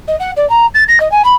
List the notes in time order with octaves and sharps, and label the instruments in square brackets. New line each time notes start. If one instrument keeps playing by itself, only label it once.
[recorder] D#5
F#5
D5
A#5
A6
A#6
D#5
G#5
B5